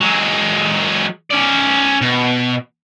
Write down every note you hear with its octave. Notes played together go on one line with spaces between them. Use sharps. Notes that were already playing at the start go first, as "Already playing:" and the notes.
F#3 G#3
C#4 D5
B2